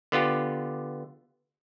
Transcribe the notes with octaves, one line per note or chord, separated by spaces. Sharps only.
D3 B3 F4 G4